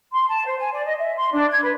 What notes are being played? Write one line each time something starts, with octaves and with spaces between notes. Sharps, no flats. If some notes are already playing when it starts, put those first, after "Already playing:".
C6
A5
C5
G#5
D5
D#5
E5
C6
D4
G#6
B4